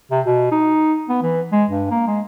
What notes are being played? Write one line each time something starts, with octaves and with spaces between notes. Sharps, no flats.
C3
B2
D#4
B3
E3
G#3
G2
A#3
G#3